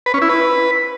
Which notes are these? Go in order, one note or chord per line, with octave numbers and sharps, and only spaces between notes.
B4
C#4
E4
B4